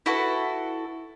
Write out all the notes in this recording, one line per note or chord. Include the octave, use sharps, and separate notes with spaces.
E4 F#4 A4 B4